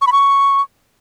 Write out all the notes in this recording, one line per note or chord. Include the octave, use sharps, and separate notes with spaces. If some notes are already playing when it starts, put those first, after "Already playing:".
C#6
B5
C#6